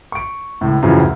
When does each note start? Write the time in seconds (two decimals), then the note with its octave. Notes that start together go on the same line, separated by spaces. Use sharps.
0.12 C#6 D7
0.61 C#2 A2
0.82 F#2 A2 C#3 E3 F3
1.00 D2